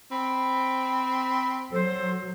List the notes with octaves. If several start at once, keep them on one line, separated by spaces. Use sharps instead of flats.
C4 B5
F#3 A4 C5